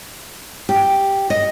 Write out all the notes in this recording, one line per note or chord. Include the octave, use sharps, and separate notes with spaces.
G4
D#5